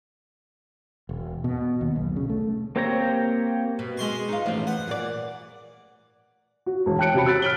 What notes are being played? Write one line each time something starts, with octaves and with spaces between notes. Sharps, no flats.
E1
B2
D#2
B1
C#3
A3
A#3 C4 G4 C#5 A#5
B2
G#3 C6 C#6
D#4 F4
A1 F3 C4
B3 F#5
A#2 D5
F#4
E1
G5 A5 F#6 C#7 D7
C3 F#4 B5
E6 F#6 A6 B6
F6 B6 D7 F#7 G7